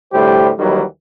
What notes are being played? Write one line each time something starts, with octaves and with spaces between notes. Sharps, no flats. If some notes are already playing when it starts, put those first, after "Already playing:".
D2 A2 G3 G4 C5
D#2 D#3 E3 F#3 G3